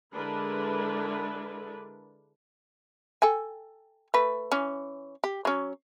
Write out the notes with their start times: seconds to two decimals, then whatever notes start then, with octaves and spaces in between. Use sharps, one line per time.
0.14 D3 G#3 D4 E4 A#4 B4
3.22 A4 G5 G#5
4.14 A3 B4
4.52 E3 C#4
5.24 G4
5.45 F#3 C#4